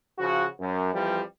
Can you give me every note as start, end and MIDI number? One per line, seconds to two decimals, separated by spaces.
0.19 0.47 49
0.19 0.47 53
0.19 0.47 66
0.60 0.92 42
0.93 1.21 41
0.93 1.21 52
0.93 1.21 53
0.93 1.21 55